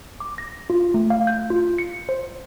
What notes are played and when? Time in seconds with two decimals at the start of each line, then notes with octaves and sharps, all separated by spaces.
0.20 D6
0.38 A#6
0.70 F4
0.94 A3
1.10 F5
1.27 G6
1.50 F4
1.78 C#7
2.09 C5